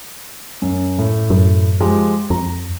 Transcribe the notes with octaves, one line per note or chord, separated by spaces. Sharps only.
F#2
A2
F#2
F3 G#3 G4
F2 A#5